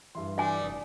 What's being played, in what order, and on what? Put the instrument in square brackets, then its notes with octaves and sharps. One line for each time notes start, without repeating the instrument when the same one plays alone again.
[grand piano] G2 E4 C6 [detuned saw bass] E3
[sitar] G3 A3 D4 [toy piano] E5 G#5
[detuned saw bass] F1 [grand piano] D#6